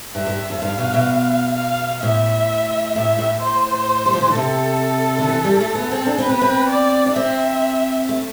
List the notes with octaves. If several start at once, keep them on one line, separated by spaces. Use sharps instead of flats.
G2 E5
G2
F2
G2 F5
B2
B2
F5
A2 E5
A2 E5
A2
C5
G3
F3
E3
D3
C3 A4
D3
E3
G3
A3
B3
C4
D4
C4 B4
B3
C4
D5
D4
C4 E5
A3